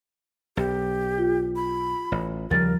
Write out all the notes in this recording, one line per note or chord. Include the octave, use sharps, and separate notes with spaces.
B1 G4
F4
B5
A1
D#2 C#3 F3 G3 A#4 A6